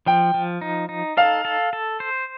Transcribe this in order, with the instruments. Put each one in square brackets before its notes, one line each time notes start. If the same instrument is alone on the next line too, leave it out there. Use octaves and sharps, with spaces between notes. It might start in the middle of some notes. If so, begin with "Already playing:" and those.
[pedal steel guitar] F3 [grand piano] G5
[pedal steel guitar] F3
D#4
D#4
[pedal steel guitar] A4 [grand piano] F5
[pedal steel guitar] A4
A4
C5